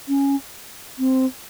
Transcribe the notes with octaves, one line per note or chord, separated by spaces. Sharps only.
C#4
C4